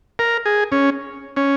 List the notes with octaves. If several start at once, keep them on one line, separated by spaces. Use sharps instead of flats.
A#4
G#4
C#4
C#4